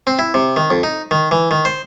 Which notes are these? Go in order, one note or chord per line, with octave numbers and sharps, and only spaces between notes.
C4
E4
C3
D#3
F2
D#4
D#3
E3
D#3
C5